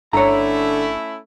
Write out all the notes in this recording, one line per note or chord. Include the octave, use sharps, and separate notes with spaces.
G1 D3 A3 C#4 E4 C#5 A#5